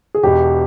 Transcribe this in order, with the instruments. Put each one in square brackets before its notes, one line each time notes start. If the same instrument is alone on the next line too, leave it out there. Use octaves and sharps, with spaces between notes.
[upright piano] G#4
[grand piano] E1 E2 B2 [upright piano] G4